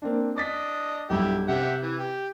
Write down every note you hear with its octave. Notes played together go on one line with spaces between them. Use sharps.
A#3 C4 D4
D4 D#5 D6 A6 B6
B1 G2 E4 G4
C3 G4 E5 F#5
E3
G4